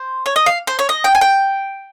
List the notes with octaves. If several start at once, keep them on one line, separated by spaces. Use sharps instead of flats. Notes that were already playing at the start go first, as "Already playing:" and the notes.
Already playing: C5
C#5
D#5
F5
C5
C#5
D#5
G5
G#5
G5